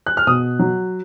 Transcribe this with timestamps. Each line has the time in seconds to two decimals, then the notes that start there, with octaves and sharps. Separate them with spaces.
0.06 F#6
0.17 F6
0.27 B2 D#6
0.59 F#3